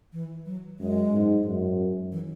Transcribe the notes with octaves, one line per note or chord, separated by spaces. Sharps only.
E3
F#3
F#2 G#3
G#2
F#2
E3